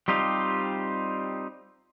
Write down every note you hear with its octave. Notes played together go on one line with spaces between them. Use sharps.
G3 C4 D#4 F4 G4